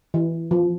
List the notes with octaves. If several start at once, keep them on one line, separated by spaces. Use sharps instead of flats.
E3
F3